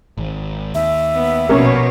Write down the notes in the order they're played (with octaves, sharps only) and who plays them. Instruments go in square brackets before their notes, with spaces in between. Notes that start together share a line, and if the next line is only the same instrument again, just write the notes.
[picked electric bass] G#1
[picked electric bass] D#2 [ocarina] E5
[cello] B3
[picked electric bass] A#1 [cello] B2 C#5 [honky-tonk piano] A#3 C#4